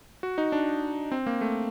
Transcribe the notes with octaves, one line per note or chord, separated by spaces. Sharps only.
F#4
D#4
D4
C4
A#3
A3